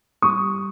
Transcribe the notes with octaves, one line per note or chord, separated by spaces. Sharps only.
G3 C#6 D#6